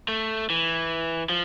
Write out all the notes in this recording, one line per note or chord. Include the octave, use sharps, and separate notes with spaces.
A3
E3
F3